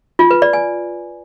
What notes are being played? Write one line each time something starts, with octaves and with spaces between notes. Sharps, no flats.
F4
B4
D5
G#5